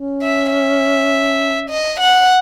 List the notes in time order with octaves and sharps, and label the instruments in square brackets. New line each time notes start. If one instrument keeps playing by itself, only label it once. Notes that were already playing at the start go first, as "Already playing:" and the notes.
Already playing: [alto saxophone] C#4
[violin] E5
E5
D#5
F#5